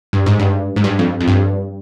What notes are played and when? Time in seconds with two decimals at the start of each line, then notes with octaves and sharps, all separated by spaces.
0.13 G2
0.26 G#2
0.39 G2
0.76 G#2
0.84 G2
0.99 F2
1.21 F2
1.28 G2